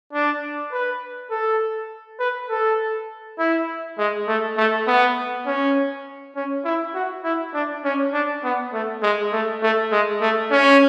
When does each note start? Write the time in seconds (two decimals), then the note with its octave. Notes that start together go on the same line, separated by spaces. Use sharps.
0.13 D4
0.72 B4
1.30 A4
2.19 B4
2.49 A4
3.39 E4
3.98 G#3
4.28 A3
4.57 A3
4.87 B3
5.46 C#4
6.36 C#4
6.65 E4
6.94 F#4
7.24 E4
7.54 D4
7.84 C#4
8.13 D4
8.44 B3
8.73 A3
9.02 G#3
9.32 A3
9.62 A3
9.92 G#3
10.21 A3
10.51 C#4